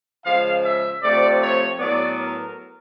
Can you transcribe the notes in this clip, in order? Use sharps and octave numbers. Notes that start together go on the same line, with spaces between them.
C#3 F3 G#3 F5
E5
C3 F3 A3 D5
C#5
A2 F#3 B3 D5
A#4